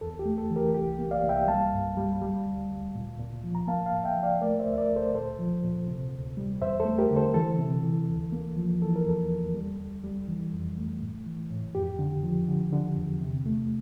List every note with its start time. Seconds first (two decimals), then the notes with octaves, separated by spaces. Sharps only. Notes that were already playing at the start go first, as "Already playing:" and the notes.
0.01 E2 A4
0.19 G4
0.25 A3
0.38 A4
0.50 E3
0.56 G4 A#4
0.74 C2 G4
0.99 A#3
1.11 D5 F5
1.23 C2
1.29 E5 G5
1.48 G3 F5 A5
1.73 G2
1.97 G3
2.22 G3
2.45 D2
2.70 D2
2.95 A#2
3.19 A#2
3.44 F3
3.55 A#5
3.67 A#3 F5 A5
3.86 F5 A5
3.92 A2
4.04 E5 G5
4.17 F3
4.23 D5 F5
4.41 A3 A#4 D5
4.59 C5 E5
4.66 D2
4.73 E5
4.78 A#4 D5
4.90 D2
4.96 A4 C5
5.14 A#2 A4 C5
5.39 F3
5.64 A#2
5.88 C3
6.13 D2
6.37 G3
6.61 E2 C5 E5
6.80 A4 C5
6.85 A3
6.98 G4 A#4
7.10 D3
7.16 A4 C5
7.34 E3 A4
7.59 C3
7.84 E3
8.08 D2
8.32 A#3
8.57 F3
8.81 E3 A4
8.96 A#4
9.06 E2 A4
9.31 E2
9.54 G3
9.79 D2
10.04 G3
10.28 E3
10.53 F2
10.77 A3
11.01 A2
11.26 E3
11.51 A2
11.75 F2 G4
11.99 D3
12.23 F3
12.48 D3
12.72 D3
12.96 E2
13.21 C3
13.46 A3